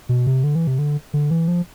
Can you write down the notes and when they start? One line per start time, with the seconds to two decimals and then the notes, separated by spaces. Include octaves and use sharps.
0.09 B2
0.27 C3
0.44 D3
0.55 E3
0.67 C3
0.79 D3
1.14 D3
1.31 E3
1.48 F3